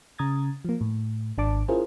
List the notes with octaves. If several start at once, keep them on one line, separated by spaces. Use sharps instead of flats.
C#3 A#5 D#6 G#6 A6
F3 A#3
A2
G#1 D4 A5 D6
C#4 E4 F4 G#4 A#4 C5